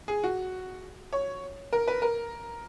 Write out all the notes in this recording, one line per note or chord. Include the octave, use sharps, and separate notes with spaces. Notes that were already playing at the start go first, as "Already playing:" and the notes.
G#4
F#4
C#5
A#4
B4
A#4